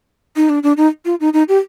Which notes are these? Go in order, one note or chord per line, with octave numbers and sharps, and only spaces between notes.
D#4
D4
D4
D#4
F4
D#4
D#4
G4